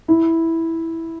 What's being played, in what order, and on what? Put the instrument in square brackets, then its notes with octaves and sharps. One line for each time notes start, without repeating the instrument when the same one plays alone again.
[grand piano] E4